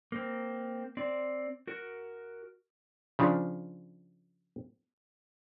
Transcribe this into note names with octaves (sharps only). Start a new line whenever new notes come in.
A#3 C4
C4 D5
F#4 A#4
C#3 F3 D4